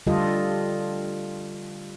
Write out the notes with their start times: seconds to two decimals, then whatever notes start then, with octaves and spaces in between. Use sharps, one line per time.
0.07 D3 G3 F4 G4 A4 D#5